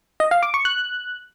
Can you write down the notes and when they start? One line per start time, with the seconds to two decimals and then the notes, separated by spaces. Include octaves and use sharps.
0.20 D#5
0.31 F5
0.43 D6
0.54 C#6
0.65 F#6